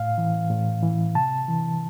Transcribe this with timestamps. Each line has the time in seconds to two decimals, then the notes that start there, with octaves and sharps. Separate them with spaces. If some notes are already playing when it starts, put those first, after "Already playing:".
Already playing: A2 F5
0.18 E3
0.50 A2
0.83 E3
1.15 C3 A5
1.48 E3